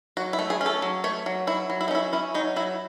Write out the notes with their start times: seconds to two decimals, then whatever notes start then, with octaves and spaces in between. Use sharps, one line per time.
0.17 F#3 F#4
0.33 E4
0.39 A3
0.50 G#4
0.61 C#4
0.66 A4
0.82 F#3
1.04 A3 C#5
1.26 F#3
1.47 F#3 E4
1.70 F#3
1.81 E4
1.88 D#4
1.91 C#4 E4
2.13 C#4 E4
2.34 F#3 D#4
2.56 F#3 E4